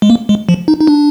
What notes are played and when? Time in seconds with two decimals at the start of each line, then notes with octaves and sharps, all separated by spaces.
0.02 G#3
0.10 A#3
0.29 G#3
0.49 F3
0.68 D#4
0.81 D#4
0.87 D4